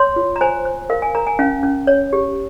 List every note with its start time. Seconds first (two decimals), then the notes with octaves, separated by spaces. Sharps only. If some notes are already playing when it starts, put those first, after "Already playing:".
Already playing: C#5 C6
0.16 F4
0.36 A#5
0.41 C5 G#5
0.65 C5
0.90 A#4 F5
1.02 G#5
1.15 A#4 A#5
1.27 G#5
1.39 C#4 F5
1.63 C#4
1.87 C#5
2.13 G4